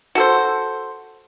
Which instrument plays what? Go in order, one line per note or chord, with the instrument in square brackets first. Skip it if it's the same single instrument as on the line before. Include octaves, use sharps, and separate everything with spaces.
[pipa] F#4 A4 C5